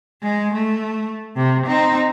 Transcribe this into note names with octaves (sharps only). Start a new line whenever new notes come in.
G#3
A3
C3
C4 D#4